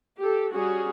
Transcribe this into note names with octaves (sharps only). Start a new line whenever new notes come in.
G4 A4
G3 C#4 F#4 G#4